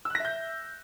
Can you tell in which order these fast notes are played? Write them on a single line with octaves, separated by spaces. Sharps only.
E6 F#6 A#6 E5 G6